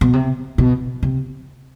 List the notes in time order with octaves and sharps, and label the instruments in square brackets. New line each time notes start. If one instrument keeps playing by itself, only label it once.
[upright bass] B2
C3
B2
C3